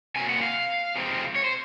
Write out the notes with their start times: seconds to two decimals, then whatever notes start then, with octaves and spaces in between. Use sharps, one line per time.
0.16 C3 F#3 A#3 G#5
0.29 F#5
0.42 F5
0.96 C3 F3 G#3 C4
1.36 C#5
1.44 C5